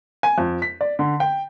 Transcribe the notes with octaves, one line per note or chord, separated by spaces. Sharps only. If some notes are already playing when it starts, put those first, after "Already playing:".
G#5
F2
B6
D5
D3
G5